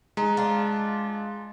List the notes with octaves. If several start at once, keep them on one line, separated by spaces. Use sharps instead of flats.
G#3 D#4
D4 F4